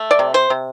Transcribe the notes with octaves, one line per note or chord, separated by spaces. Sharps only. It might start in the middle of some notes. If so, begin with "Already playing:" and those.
Already playing: A3
D5
C3
C5
C3